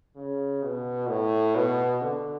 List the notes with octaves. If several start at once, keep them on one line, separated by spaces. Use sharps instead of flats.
C#3
B2
A2
B2
D3